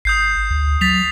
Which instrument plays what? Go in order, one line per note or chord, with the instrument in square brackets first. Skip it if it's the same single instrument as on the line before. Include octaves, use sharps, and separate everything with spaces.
[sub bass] G#1 [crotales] D#6 G6 C7
[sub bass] D2
[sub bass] F#3 [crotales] A6 B6 F7